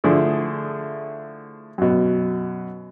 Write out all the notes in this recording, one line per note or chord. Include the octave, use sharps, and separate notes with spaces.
D3 F3 A3 E4 G#4
F#2 B2